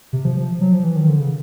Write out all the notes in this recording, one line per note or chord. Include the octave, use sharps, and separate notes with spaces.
C3
F3
F3
F#3
F3
E3
D#3
D3
C#3